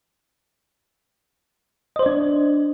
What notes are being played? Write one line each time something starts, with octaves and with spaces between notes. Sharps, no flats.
D4 C5 D5 D#5